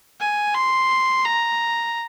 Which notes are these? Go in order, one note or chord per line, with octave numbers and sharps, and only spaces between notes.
G#5
C6
A#5